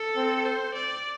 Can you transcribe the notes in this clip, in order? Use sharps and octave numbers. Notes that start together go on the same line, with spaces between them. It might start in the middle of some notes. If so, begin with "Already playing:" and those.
Already playing: A4
C4
C5
D5